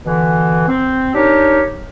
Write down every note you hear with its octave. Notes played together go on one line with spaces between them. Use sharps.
B2 D3 E3
C4
D4 D#4 G4 A#4 C#5